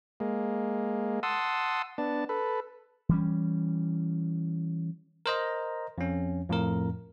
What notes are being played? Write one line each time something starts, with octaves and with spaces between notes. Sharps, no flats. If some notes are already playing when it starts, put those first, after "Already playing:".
G#3 A#3
F#5 A5 C6 D#6 E6
B3 D4 A5
A4 B4
E3 G3 C#4
A#4 C5 D#5 A#5
F2 C#4
F2 A2 A#4